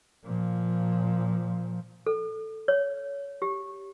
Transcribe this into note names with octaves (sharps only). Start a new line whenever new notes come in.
A#2 F3
A4
C#5
G4